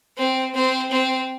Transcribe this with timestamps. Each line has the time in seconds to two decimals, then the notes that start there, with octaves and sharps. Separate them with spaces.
0.18 C4
0.55 C4
0.92 C4